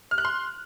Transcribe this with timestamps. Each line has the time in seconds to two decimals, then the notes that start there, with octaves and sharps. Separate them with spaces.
0.11 F6
0.18 F#6
0.25 C6